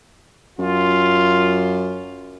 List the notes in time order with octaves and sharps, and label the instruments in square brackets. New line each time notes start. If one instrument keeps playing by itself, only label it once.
[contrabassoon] F#2 [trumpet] F4